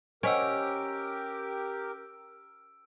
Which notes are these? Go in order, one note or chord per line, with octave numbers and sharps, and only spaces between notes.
C#4 G4 A#4 C5 D#5 F#5 E6 D7